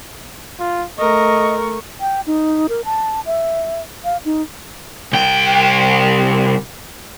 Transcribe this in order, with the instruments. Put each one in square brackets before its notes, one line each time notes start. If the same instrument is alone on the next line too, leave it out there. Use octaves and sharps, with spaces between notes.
[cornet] F4
[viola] A3 C#6 [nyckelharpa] A#4 [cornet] D#5
[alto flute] G5
D#4
A#4
A5
E5
F5
D#4
[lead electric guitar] C2 G5